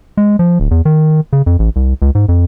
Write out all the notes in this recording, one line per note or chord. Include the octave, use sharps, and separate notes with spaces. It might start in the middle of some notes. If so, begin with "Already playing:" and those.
G#3
F3
D1
E2
D#3
C#3
F2
A1
C2
C#2
G#2
F2